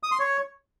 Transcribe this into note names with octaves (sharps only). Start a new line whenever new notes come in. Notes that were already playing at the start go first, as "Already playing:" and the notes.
D#6
C6
C#5